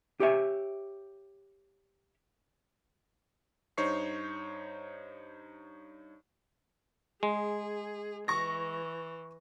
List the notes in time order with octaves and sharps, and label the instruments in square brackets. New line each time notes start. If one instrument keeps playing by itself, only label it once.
[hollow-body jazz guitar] G4 C#5 E5
[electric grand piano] G2 D#4 C5 C#5 C#6 C7
[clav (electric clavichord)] G#3 [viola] G#4
[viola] E3 [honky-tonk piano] C#6 A#6